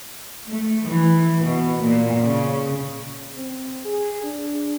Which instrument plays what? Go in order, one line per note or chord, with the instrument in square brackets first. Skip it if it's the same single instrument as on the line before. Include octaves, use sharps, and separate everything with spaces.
[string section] A3
E3
B2
A#2
C#3
[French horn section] C4
G#4
D4